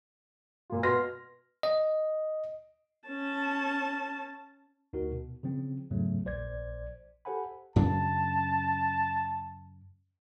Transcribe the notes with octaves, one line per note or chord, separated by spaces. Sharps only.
A#2 F4
B2 C6 F6 A#6
D#5
C#4 A5
D2 D#4 F#4 A#4
B2
C#3 F3 C4
E2 G#2 C#3 F#3 A3
A#1 C5 D5 G#6
G4 A4 C5 F#5 G#5 B5
F#2 C#3 D4 A5